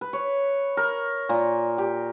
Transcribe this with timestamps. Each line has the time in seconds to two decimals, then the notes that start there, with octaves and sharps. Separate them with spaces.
0.01 B4
0.13 C#5
0.77 A#4
1.29 A#2
1.78 G4